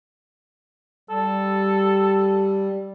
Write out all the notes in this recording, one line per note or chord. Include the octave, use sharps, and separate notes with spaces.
G3 A4